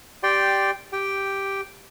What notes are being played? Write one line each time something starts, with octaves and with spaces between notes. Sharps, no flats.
G4 D5 G5 C6
G4 G5